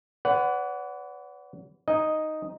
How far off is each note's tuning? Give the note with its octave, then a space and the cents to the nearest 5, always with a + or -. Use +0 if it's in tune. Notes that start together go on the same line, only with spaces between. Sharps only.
B4 +25 D5 -45 F#5 +0
D#4 +0 D#5 +0 G#5 -20